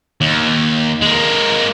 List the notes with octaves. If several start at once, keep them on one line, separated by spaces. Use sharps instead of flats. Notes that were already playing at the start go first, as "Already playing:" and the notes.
D#2
G#3 A#3